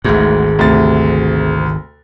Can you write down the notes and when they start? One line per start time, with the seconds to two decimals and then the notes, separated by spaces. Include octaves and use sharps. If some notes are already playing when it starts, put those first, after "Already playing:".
0.05 G#1 D2 G#2 G#4
0.59 D2 C3 A6